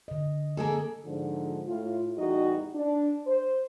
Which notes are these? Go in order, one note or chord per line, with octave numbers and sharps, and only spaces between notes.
D3 D#5
A#3 G#4 A4
G#2 D3 F3
A2 F4
E2 A2 G3 D#4 F#4 D#5
D4
C5